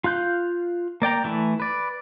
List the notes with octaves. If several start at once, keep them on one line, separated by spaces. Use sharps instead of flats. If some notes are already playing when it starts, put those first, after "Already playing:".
F4 F5 F#6 G6
A#3 D5 G5 A#5
E3 A3 E4
B4 D5